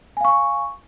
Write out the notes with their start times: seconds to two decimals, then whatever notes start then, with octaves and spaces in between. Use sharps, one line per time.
0.17 G#5
0.21 F5
0.25 C#6